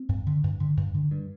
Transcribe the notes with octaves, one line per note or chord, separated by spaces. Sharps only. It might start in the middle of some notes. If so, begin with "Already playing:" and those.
Already playing: C4
G2
D3
G2
D3
G2
D3
G2